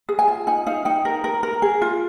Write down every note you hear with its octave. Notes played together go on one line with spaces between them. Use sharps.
G#4
G#5
F4
D#4 G#5
D#4 F5
D#4 G5
A#4
A#4
A#4
G#4
F4